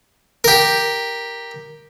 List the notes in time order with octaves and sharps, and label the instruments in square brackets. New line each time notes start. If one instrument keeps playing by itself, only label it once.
[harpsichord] G4 A#4